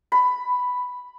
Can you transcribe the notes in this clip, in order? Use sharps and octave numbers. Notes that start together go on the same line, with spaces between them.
B5